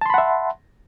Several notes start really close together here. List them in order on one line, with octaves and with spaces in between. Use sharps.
A5 C6 B5 F#5 E5